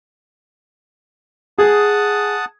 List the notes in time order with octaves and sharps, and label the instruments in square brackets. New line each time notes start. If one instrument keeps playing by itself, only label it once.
[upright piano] G#4 [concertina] F#5 A5 D#6